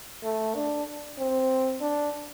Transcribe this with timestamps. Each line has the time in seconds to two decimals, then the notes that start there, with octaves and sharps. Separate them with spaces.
0.24 A3
0.55 D4
1.18 C4
1.81 D4